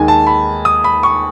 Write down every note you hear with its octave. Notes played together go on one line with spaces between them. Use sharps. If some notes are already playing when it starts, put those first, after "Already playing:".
Already playing: D#2 D#3 G#3 G#5
A5
B5
D#6
B5
C#6